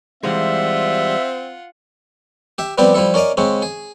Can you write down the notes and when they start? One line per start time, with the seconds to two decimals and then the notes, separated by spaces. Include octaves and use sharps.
0.23 E3 G3 G#3 C4 F4 E5 F#5
2.58 G4 E5
2.78 F3 G3 B3 C4 G4 D5
2.94 F3 G3 E4 A4
3.14 C#4 A#4 D5 D#5 F5
3.37 C#3 G#3 C4 C#4
3.62 G#4